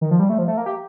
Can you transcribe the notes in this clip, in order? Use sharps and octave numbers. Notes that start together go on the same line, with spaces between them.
D#3
F3
G3
A3
F3
A3
A#3
G4